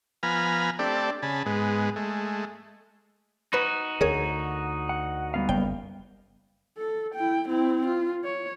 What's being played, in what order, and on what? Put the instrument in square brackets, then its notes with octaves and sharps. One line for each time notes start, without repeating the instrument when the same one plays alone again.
[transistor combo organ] F3 B3 G#5 A#5 B5 F6
A3 C4 D4 G4 A4 D5
C#3 G#4 A5 B5
G#2 G#3 B3
G#3 A3
[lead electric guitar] D#4 F#4 [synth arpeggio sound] B4 B5
[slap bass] D2 D3 [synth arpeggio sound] G#4 A#4 C#5
[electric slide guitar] F#5
G3 B3 F5
[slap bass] F#1 [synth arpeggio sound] G5
[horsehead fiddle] A4
E4 G5
C4 E4
F4
C#5